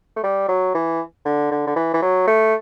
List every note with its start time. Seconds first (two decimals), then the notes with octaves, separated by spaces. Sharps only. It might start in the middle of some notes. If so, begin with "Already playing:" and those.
0.17 A3
0.24 G3
0.49 F#3
0.74 E3
1.25 D3
1.51 D3
1.67 D3
1.76 E3
1.94 E3
2.02 F#3
2.28 A3